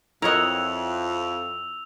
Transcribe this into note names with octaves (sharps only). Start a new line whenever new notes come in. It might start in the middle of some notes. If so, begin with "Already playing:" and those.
F2 E4 A#4 C#5 D#5 F#5 E6 F7